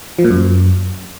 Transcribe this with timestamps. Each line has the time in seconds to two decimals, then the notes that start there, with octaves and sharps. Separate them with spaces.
0.19 F3
0.24 A#2
0.30 F#2